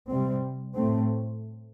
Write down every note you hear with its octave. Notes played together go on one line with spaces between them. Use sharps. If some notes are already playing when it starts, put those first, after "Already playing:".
C3 G3 C4
A2 A3 C4